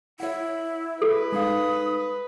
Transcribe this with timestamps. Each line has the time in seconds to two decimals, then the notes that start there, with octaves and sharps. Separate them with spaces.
0.20 E4 C#5 F#5
1.02 A4 B4
1.32 G#3 D#4 F5 D#6